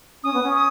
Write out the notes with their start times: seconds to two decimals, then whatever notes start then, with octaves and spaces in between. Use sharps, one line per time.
0.23 C#4 D#6
0.34 B3
0.43 C#4
0.54 D#6